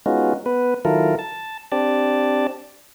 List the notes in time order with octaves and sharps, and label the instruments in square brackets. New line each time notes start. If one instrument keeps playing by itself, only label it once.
[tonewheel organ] G#3 B3 C#4 D#4 F4 F#4
B3 B4
D#3 F#3 E4 F4 A4 A#4
A5
C4 D4 G4 D5 A5